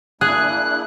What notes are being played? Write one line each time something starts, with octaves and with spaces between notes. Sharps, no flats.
A#3 D4 E4 G#4 F#6